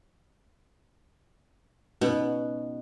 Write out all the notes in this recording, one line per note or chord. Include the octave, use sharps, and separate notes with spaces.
B2 B3 C#4 D#4 F#4